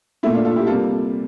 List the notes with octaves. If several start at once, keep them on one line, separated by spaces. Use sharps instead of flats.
A#2 A3 E4
D4 F4
F4 A4
E4 G4
C3 G3 A#3 F4 A4